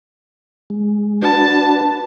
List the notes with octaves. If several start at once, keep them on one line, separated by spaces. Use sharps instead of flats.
G#3
D4 F#4 B4 A5